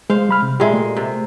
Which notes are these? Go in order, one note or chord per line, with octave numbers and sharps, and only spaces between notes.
G#3 C5 F5
G3 B5 F6
C3
A#2 G#3 G4 D5 E5
A3
C3